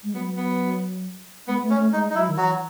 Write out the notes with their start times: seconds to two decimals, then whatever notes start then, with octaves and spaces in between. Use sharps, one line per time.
0.04 G#3
0.14 F#3 B3
0.37 B3
1.47 G#3 B3
1.62 A3
1.70 C#4
1.77 A3
1.92 G#3 D#4
2.10 D#4
2.15 F#3 E4
2.28 D#3
2.37 E3 F#3 F#4